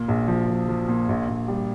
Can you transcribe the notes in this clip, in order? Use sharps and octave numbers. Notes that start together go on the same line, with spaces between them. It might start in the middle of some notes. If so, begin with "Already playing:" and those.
Already playing: A#2
A#1
F3
F3
F3
A#2
A#1
A#1
G3